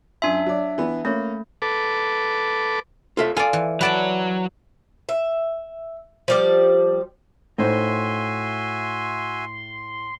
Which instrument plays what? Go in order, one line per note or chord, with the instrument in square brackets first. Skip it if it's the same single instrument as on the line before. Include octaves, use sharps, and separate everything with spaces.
[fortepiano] F#2 G#5 C6 [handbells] D4 E5
[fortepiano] F#3 D5
E3 B3
[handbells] A3 [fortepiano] A#3 C#4
[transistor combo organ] A4 B4 D6
[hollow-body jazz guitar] F4 A4 E5
[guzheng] F4 D5 [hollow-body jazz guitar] A4 G#5
[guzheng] E3
[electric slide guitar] F#3 F#5 [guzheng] B4 D5 A5
[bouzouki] E5
F3 G3 D5
[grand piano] A2 [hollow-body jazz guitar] D#4 C5 [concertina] F#4 E5 G#5 [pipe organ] C6